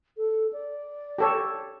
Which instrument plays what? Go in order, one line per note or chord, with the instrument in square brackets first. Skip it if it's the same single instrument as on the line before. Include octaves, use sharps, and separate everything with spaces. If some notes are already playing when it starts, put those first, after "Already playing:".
[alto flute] A4
D5
[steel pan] G4 A4 C#5